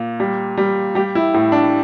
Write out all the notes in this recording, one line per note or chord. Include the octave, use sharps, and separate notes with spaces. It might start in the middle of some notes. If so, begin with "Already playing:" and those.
Already playing: A#2
G3
G3
G3 G4
E4
A2
D4